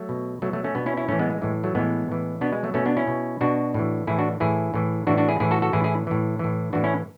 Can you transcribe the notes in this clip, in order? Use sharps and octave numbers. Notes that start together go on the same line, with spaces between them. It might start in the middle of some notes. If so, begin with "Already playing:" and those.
Already playing: F#3 A3
B2
B2 F#3 A3
F#3 A3
A3 C#4
B2 B3 D4
C#4 E4
C#4 E4
A2 E3 A3 C#4
G#3 B3
G#3
A2 E3 G#3
F#3 A3
A2 E3 G#3 B3
A2 E3
B2 B3 D4
G#3
F#3 A3
B2 A3 C#4
B3 D4
C#4 E4
B2
B2 D4 F#4
A2 E3
A2 E3 E4 G#4
D4 F#4
A2 E3 E4 G#4
A2 E3
A2 E3 D4 F#4
D4 F#4
E4 G#4
A2 E3 E4 G#4
F#4 A4
F#4 A4
A2 E3 E4 G#4
E4 G#4
A2 E3
A2 E3
A2 E3 D4 F#4
C#4 E4